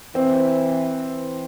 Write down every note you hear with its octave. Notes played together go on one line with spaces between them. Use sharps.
E3 C4
E3